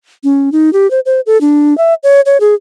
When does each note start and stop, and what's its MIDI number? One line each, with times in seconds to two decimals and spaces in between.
0.24 0.52 61
0.52 0.73 63
0.73 0.90 67
0.91 1.00 72
1.06 1.20 72
1.26 1.40 69
1.41 1.76 62
1.78 1.94 76
2.03 2.21 73
2.26 2.37 73
2.40 2.54 68